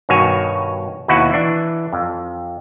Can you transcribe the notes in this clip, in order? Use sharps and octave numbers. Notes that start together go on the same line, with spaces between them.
G2 B2 D#3 F#4 C#5 G#5
D#2 B2 D#4 E4 F#4 F#5
E3 D4
F2